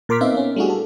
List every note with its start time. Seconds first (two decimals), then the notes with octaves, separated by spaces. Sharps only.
0.09 A#2 A#4 C6 D6 F6 B6
0.21 B3 C4 D#4 A#4 E5 F5
0.34 B3 C#4
0.56 G3 A3 D4 E4 F#4 G#4
0.70 A4